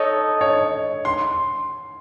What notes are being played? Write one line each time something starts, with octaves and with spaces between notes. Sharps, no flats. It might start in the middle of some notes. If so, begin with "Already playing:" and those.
Already playing: D#4 A4 C#5 D#5 A5
C#5
C6